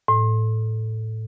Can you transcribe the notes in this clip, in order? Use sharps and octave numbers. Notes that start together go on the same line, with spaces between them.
A2